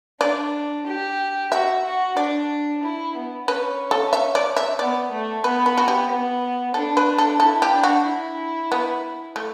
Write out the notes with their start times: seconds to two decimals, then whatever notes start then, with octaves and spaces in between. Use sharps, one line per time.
0.21 D4 D5
0.86 G4
1.51 F#4 E5
1.84 F#4
2.17 D4 D5
2.83 E4
3.15 B3
3.48 C#4 B4
3.91 A4
4.13 E5
4.35 D5
4.56 E5
4.79 B3 D5
5.12 A3
5.44 B3 B4
5.66 B4
5.77 F#4
5.88 G4
6.10 B3
6.74 D4 A4
6.97 B4
7.18 A4
7.40 E4 A4
7.62 G4
7.73 D4
7.83 F#4
8.06 E4
8.72 B3
9.36 A3